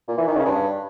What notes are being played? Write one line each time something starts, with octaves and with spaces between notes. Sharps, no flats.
A#2
E3
D#3
C#3
G2